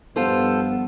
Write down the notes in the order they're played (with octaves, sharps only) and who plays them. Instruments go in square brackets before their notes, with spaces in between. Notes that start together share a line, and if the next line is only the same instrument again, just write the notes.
[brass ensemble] G2 F3 [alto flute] B3 [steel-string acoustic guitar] F4 A4 C5